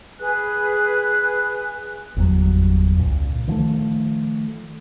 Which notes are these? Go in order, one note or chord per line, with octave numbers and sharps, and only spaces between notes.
G#4 B4 G#5 F#6
G1 E2 F#3
C#2 A#2
D#3 F3 G#3 A3